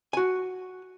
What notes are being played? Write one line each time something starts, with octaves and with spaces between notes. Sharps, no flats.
F#4 G#5